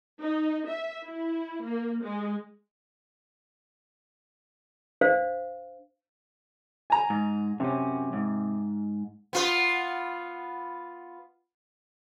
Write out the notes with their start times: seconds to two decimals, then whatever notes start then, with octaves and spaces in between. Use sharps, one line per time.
0.20 D#4
0.68 E5
1.05 E4
1.63 A#3
2.04 G#3
5.01 D4 C5 F5
6.90 G#5 A#5
7.10 G#2
7.60 F#2 C3 C#4
8.13 G#2
9.33 B3 F4 B4